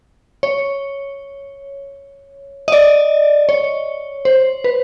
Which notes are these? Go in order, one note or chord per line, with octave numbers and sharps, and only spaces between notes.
C#5
D#5
D5
C#5
C5
B4